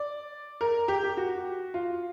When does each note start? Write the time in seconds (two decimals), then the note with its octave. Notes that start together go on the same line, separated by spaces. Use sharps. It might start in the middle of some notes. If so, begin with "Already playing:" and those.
Already playing: D5
0.61 A#4
0.88 G4
1.04 G4
1.17 F#4
1.74 F4